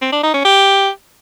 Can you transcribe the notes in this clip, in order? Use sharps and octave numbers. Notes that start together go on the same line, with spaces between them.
C4
D4
D#4
C#4
G4